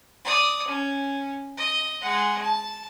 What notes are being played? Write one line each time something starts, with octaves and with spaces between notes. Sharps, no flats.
D5 D#6
C#4
D#5
G#3 F#5
A5